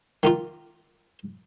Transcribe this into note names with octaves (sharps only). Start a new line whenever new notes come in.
D#3 A#3 F4